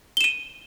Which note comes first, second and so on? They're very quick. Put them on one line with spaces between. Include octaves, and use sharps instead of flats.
G7 E7 D#7